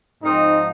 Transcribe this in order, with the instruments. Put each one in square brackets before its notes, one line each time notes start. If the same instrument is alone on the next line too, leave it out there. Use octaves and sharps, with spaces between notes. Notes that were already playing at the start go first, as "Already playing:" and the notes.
[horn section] G#2 F3 G#3 C4 D#4